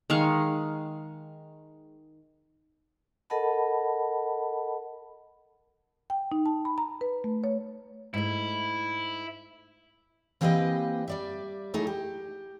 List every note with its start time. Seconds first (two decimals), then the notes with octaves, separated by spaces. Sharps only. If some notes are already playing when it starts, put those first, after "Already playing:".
0.10 D#3 G#3 F5 C#6
3.30 A4 A#4 D#5 F#5 A5 B5
6.10 G5
6.32 D#4
6.46 A5
6.65 B5
6.78 A#5
7.01 B4
7.24 A3
7.44 C#5
8.14 G#2 A3 E4
10.41 E3 A#3 C4 G4 B4 D#5
11.08 G3 D5 E5
11.74 F#3 A3 D#4 E4 G#4
11.87 G4